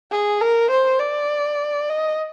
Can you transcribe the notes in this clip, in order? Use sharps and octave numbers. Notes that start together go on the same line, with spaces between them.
G#4
A#4
C5
D5
D#5